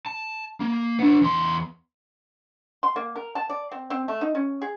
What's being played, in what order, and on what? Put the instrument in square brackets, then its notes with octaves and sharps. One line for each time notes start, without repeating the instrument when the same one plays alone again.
[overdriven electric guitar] A5
A#3
B3 D4
E2 C6
[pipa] C6
A#3
A#4
A5
D5
C4
C4
A3
D#4
C#4
G#4